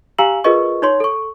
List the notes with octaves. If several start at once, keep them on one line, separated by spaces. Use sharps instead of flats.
G4 F5 G#5 A#5 E6 F#7
F4 G#4 A#4 B4 D#5 C#6
D#4 C#5 C6
A4 C#6